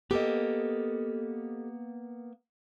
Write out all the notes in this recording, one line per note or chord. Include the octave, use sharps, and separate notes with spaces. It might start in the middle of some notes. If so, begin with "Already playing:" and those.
A#3 B3 G4 A4 D#5